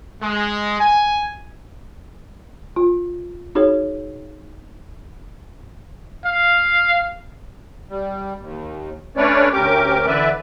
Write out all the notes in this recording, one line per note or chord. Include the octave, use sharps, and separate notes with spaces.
G#3
G#5
F4
D#4 F#4 G#4 C#5
F5
G3
D#2
A3 C#4 D4 B4 C#5 D5
D2 C#4 G4 A#4 D6
D3 E3 B4 D5 E5